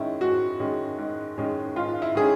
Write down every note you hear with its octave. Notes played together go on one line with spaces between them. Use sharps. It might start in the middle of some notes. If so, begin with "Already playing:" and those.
Already playing: G#2 D#3 G#3 C#4 E4
G#2 F#4
D#3 G#3 C#4
G#2
D#3 G#3 C#4
G#2 F4
E4
D#3 G#3 C#4 G#4